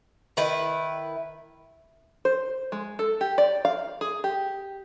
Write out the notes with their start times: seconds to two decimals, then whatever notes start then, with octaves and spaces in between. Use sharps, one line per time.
0.37 D#3 E4 B4
2.25 C5
2.72 G#3
2.99 A4
3.21 G4
3.38 D5
3.65 F5
4.01 G#4
4.24 G4